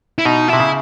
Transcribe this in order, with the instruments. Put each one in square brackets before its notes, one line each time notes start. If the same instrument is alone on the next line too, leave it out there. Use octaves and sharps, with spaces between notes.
[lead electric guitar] E4
[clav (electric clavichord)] B2 [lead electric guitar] D#4
[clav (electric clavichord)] C3 [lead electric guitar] E4
[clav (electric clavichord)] C#3